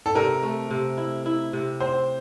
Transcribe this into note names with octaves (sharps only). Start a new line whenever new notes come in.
A4
C3 A#4
A3
C3
E4
E4
C3
C4 C5